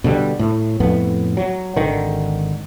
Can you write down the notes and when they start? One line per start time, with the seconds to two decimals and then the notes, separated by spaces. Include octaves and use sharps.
0.04 B2 D3 E3 G3
0.39 A2
0.80 F2 A2 B3
1.37 F#3
1.77 G#1 D3 D#3